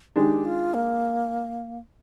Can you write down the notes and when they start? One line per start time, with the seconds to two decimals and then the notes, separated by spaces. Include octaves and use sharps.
0.16 D#3 G#3 D4 G4
0.45 F4
0.74 A#3